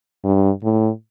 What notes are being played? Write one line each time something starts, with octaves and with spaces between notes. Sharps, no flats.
G2
A2